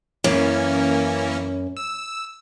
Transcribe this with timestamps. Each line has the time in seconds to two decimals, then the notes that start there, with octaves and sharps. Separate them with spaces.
0.24 F#2 E3 A#3 C#4
1.77 E6